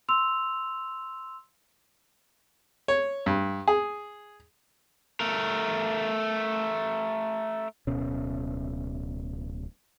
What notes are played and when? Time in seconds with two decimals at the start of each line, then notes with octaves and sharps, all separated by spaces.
0.09 C6 E6 F7
2.88 C#5
3.26 G2
3.68 G#4
5.20 A3 A#4
7.87 D1 B2 C#4